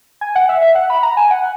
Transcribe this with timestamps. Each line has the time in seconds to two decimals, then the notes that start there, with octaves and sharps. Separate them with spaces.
0.21 G#5
0.36 F#5
0.49 E5
0.62 E5
0.75 F#5
0.90 B5
1.03 A#5
1.17 G#5
1.30 F#5